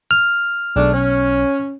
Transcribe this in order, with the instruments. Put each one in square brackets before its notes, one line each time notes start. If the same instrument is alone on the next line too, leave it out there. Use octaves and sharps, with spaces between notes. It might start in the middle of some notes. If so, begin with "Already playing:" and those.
[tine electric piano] F6
[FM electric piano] B1 [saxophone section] G#3 A3 D4
[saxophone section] C#4